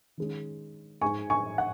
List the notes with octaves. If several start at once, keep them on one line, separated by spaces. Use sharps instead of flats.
D#3 G#3 C#4
G#2 G#3 D#4 G#5 C#6
G#5 C#6
F#5